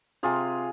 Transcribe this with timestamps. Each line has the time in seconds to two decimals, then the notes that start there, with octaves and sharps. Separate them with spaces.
0.23 C3 F4 G#4